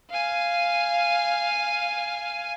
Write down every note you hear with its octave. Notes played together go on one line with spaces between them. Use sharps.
F5 G#5